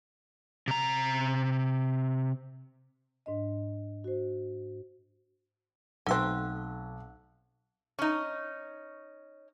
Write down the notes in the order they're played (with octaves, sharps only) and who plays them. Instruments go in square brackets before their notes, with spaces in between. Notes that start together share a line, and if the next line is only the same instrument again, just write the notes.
[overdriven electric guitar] C3 A#5
[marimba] G#2 D4 D#5
F#4 C5
[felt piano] B1 [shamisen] A3 C4 [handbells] F#5 E6 F#6
[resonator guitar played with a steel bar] C#4 D#4